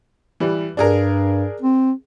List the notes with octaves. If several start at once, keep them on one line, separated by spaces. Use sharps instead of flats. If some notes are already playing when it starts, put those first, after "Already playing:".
E3 G3
G2 D4 G#4 A#4
C4